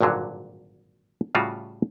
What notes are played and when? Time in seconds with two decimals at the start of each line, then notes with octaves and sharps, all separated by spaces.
0.01 G#1 G2 A#2 D3 F#3
1.35 A2 C#3 G3 F4 F#4